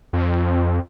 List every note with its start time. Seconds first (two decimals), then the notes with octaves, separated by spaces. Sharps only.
0.13 F2